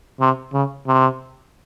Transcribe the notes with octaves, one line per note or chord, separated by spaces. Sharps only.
C3
C#3
C3